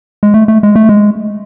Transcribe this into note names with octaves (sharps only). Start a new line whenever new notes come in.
G#3
A3
A3
G#3
A3
G#3